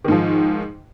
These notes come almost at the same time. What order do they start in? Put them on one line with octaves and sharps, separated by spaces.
D#3 G#2 F3